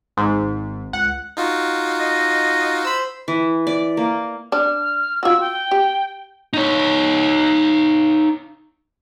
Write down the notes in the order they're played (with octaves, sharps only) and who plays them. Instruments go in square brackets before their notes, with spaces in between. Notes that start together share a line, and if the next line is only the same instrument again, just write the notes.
[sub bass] G#1 [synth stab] G#2
[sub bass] G#1
[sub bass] C#2 [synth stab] F#5
[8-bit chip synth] D#4 F4 F#4
[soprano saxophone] D#5
[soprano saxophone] C5 [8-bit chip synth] B5 E6
[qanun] E3
D5
A#3
[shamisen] D4 [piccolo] F6
[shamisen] F4 F#4 [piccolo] E6
[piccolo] G5
[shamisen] G4
[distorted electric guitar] D#4 C#5